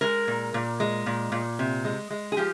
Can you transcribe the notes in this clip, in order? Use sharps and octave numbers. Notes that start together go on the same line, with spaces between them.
G#3 A#4
A#2
A#2
G#3
A#2
A#2
C3
G#3
G#3
G#4
F3 G4